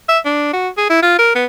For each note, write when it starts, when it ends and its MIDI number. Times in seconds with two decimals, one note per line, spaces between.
0.09 0.19 76
0.25 0.51 62
0.53 0.68 66
0.77 0.89 68
0.90 1.00 64
1.03 1.16 65
1.19 1.35 70
1.35 1.46 59